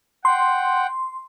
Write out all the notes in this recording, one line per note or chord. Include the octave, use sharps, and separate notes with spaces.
F#5 G5 C6